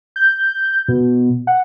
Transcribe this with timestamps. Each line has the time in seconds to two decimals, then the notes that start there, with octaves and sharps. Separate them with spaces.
0.16 G6
0.88 B2
1.47 F#5